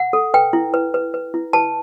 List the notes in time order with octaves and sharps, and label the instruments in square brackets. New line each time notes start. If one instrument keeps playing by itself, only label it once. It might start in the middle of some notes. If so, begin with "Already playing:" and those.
Already playing: [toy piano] F#5
A4
B4 G5
E4
B4
B4
B4
E4
B4 A5